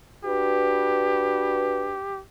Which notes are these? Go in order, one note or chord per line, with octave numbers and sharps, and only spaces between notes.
D4 F#4 G4 B4